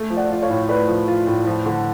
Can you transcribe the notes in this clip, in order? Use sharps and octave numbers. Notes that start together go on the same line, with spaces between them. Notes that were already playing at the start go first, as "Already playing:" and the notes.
Already playing: A3
F3
D5 F#5
F4 D5
C#5 F5
A2
A3 B4 D5
F3
F4
A2
F3
D3